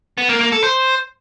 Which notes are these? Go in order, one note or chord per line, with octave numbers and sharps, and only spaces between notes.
B3
A#3
A#3
A4
C5